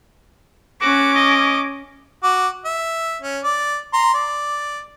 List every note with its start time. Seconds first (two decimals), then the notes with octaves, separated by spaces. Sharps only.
0.82 C#4 F#4 D6
1.14 D#5
2.23 F#4 D6
2.65 E5
3.22 C#4
3.44 D5
3.93 A#5 C6
4.14 D5